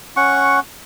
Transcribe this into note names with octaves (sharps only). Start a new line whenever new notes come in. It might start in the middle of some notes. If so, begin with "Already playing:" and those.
C#4 F#5 C#6